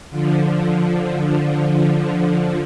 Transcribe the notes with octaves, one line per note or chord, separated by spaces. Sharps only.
D3 F3